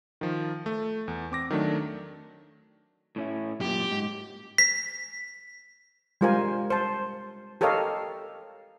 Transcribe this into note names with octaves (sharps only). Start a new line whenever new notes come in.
D#3 F3
A3
E2
C4 D6 A#6
D#3 F#3 A3 D4
A2 C#4 E4
F#2 A#2 G4
G#2
B6
G3 G#3 F4 A#4 C5 G#5
C5 A5
G4 A4 A#4 C#5 D#5 F5